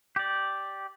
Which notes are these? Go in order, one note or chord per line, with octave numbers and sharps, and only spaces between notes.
G4 D5